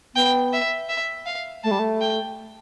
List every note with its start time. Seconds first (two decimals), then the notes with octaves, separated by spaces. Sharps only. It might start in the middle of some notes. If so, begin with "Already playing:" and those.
0.15 B3 G5
0.53 E5
0.89 E5
1.26 F5
1.64 A3 A5
1.71 G3
1.79 A3
2.01 G5